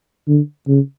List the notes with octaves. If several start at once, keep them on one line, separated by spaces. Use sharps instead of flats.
D3
C#3